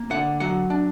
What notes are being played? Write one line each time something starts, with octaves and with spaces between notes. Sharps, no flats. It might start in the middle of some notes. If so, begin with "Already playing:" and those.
Already playing: A#3
D3 F#5
F#3 F#5
D4